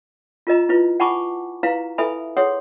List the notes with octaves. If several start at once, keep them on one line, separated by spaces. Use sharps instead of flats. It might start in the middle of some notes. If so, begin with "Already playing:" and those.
F4 A#4 D#5 A#5
E4 F4 B4
F#5 G#5 A5 B5 C#6 D6
E4 B4 F5 A#5
E4 A4 B4 E5 G#5 B5
G#4 C#5 F#5 C6 D#6